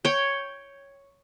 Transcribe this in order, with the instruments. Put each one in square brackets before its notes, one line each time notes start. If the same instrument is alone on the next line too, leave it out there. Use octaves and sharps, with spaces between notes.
[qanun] C#5 G5